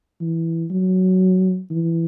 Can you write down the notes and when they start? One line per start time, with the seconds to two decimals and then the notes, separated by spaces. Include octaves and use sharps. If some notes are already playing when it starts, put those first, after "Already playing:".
0.21 E3
0.71 F#3
1.70 E3